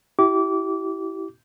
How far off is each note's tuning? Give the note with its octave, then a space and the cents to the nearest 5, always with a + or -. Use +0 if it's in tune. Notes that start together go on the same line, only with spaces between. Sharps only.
E4 +0 G4 -30 D6 -25